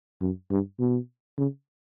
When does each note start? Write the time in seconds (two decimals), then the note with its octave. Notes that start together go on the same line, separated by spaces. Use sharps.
0.21 F#2
0.50 G2
0.79 B2
1.38 C#3